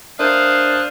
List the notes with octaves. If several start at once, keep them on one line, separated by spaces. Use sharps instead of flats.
D4 A#4 C5 E5 F5 D#6 F#6